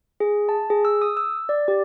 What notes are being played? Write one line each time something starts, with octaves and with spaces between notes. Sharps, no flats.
G#4
A5
G#4
E6
D#6
E6
D5
G4